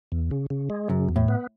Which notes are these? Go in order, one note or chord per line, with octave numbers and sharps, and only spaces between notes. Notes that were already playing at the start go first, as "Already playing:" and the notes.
E2
C#3
C#3
G#3
F#2 C#3
E2
A2
B3